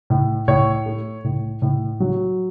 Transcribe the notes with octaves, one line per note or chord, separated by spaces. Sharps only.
A2
A2 C#5
A3
A2
A2
F#3